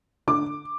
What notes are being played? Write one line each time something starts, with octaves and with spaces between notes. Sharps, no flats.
D3 D6